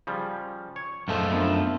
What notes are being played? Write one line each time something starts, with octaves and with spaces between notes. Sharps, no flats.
C#3 F3 G3
C#5
C#2 F#2 A#2 F3 A3 A4
F2 F3 B3 D4 A#4